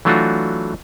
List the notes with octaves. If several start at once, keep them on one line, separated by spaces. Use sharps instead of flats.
E3 F#3 A3 D4 F4 F#4